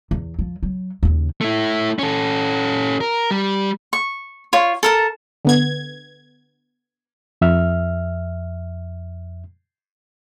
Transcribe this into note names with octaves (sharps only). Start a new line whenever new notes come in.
E2
F3
F#3
D#2 C#3
A3 E4
C#4 A4
A#4
G3
C#6
F4 C#5
A4 A#4 A5
D3 B3 G#6
F2 E5 F6